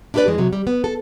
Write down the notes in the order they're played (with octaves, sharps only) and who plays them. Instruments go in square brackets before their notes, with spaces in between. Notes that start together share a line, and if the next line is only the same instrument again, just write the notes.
[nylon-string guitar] D4 E4 G4 A4 B4 D5
F2 E3 G#3
C3 F#3
G3
B3
A4